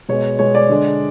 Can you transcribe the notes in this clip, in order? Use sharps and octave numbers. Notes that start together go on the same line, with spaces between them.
B2 G#3 C#5
B2 G#3 C#5
D5
D3 G#3